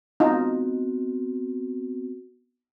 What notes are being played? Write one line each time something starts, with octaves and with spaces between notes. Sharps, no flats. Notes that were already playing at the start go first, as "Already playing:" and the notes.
B3 C4 D#4 F4 F#4